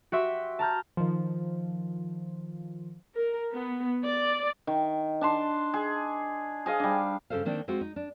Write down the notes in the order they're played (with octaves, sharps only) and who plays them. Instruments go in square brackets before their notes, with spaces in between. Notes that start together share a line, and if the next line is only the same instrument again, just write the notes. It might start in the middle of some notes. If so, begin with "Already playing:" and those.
[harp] F#4 G4 E5 C6
A5 A#5 F6 G6
[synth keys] D#3 F3
[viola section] A#4
B3
D5
[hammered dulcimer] D#3
D4 A5 C6
G#4
G#4 D#5 F5
G3 D4
[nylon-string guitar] G2 C#3 G3 A4 C5 F5
D#3 A#3 C4 D4
G#3 C4 F4 F#4
D#4
D4